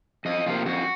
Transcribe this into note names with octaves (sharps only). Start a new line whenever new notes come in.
F2 D#5
C3 F3 A#3 F4
F2 F#4